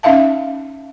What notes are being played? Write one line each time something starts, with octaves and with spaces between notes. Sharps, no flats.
C#4 D#4 E5 F5 A5